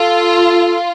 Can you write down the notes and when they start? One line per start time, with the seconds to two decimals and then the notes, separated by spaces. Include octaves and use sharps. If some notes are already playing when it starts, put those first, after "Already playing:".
Already playing: F4 A4